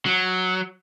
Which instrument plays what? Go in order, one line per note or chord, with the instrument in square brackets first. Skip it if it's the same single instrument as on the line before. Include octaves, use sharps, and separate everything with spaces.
[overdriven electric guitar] F#3